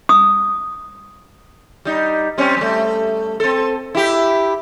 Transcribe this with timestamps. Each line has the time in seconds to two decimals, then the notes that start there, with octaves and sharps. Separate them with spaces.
0.09 D#6
1.85 G3 D#4
2.38 G3 C4 C#4
2.57 G3 A3
3.40 C4 A4
3.95 E4 G4